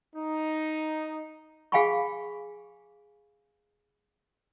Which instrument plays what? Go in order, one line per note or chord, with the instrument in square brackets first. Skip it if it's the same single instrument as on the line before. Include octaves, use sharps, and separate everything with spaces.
[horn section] D#4
[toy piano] G#4 F5 G5 G#5 B5 C#6